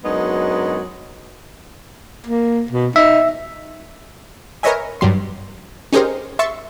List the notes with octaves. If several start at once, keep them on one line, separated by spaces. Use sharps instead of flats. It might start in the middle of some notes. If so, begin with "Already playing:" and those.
F#2 F#3 G#3 B3 D4 D#4
A#3
B2
D#4 E5
A#4 B4 C#5 D#5 E5 G#5
G2 F#3 G3 C6
C#4 D#4 G4 G#4 A#4 C5
E5 C6 C#6 E6 A6 C#7